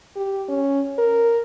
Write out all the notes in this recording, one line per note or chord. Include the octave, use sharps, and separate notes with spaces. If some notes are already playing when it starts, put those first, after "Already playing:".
G4
C#4
A#4